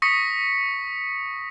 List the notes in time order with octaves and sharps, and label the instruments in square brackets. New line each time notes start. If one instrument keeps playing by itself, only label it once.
[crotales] C#6 D#6 A#6 B6 C#7